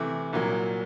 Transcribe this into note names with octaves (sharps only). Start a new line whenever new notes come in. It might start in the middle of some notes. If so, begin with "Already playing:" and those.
Already playing: C3 E3 A3
C2 A#2 F#3 A#3